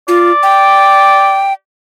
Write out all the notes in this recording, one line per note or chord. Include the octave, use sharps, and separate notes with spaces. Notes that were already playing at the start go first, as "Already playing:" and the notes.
F4 D5
G5